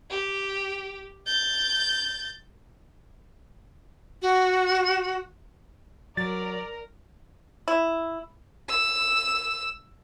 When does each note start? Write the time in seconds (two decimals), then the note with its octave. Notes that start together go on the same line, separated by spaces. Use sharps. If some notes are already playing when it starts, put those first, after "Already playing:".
0.10 G4
1.26 G6 A6
4.22 F#4
6.17 F#3 A#4 D5 A6
7.68 E4
8.69 E6